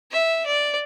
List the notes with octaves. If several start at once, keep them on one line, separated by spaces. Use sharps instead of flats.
E5
D5